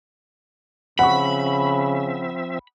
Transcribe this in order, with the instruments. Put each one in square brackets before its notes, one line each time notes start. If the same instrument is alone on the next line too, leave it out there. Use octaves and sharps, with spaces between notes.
[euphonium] C#3 [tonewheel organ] F3 C4 E5 [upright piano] F#5 C#6 [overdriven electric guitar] B5